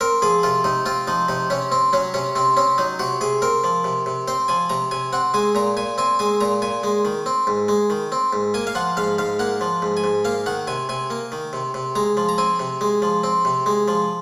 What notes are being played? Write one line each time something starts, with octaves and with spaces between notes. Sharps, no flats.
C4 A#4
F3 G#4
C3 F4
C3 D#4
C4 F4
F3 D#4
C3 D#4
C3 C#4
C4
F#3 C#4
C3 C#4
C3 C4
C4 C#4
F#3 D#4
C3 F#4
C3 G#4
C4 A#4
F3
C3
C3
C4 C5
F3 G#5
C3 A#5
C3 G#5
C4 F#5
G#3 G#5
A#2 A#5
A#2 G#5
C4 G#5
G#3 G#5
A#2 A#5
A#2 G#5
G#3
D#3
C4
G#2
G#3
D#3
C4
G#2
A#3 G#5
F5
F3 F#5
G#2 F5
G#2 F5
A#3 F#5
F3
G#2
G#5
G#2
A#3 F5
D#3 F#5
C3 G#5
C3 G#5
A#3
D#3
C3
C3
G#3 A#5
F3
A#5
C4 G#5
C3
G#3
F3
C4
C3
G#3
F3